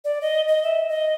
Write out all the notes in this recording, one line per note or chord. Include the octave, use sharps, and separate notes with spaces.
D5
D#5
D#5
E5
D#5